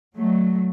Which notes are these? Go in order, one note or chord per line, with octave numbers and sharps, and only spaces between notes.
F#3 A3